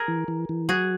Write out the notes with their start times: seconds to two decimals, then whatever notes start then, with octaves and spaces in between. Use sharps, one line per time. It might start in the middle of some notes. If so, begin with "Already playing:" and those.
Already playing: G#4 A#4
0.08 E3
0.28 E3
0.49 E3
0.69 F#3 F#4 G#4